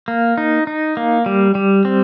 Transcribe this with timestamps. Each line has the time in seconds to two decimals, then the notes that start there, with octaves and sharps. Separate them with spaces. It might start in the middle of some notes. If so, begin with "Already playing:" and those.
0.08 A#3
0.38 D#4
0.67 D#4
0.97 A#3
1.26 G3
1.55 G3
1.85 C4